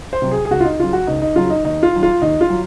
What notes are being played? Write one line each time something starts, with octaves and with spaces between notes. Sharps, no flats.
C5
C3 F#3
G#4
G#4
C#2 F#4
F4
D#4
C#3 F#3 F4
F#4
C#2 D#4
D#4
C#3 F#3 F4
D#4
D#2 D#4
F4
D#3 F#3
F4
D#2 D#4
F4
F#3